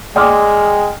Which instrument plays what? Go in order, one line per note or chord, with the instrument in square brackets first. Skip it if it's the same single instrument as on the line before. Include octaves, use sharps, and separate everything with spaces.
[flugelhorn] G#3 [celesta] D5 C6 D6 [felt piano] G5 D#6 F6